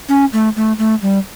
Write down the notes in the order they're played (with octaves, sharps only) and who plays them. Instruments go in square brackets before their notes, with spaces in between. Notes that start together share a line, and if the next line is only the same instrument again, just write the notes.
[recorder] C#4
A3
A3
A3
G3